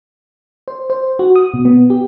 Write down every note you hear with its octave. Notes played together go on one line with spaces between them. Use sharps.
C5
C5
F#4
D#6
B2
B3
G4